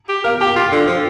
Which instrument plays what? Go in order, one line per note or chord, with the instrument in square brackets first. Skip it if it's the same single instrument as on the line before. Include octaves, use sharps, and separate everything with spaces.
[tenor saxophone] G4
[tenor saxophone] A#4 [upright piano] F5
[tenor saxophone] G4 [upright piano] G5
[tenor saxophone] F4
D3
F3